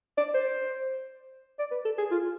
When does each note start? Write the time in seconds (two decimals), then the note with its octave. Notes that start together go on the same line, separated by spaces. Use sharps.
0.18 D5
0.34 C5
1.59 D5
1.71 B4
1.85 A4
1.98 G#4
2.11 F4